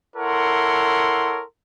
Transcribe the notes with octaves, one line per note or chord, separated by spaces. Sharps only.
E4 A4 A#4 C#5 F#5 C6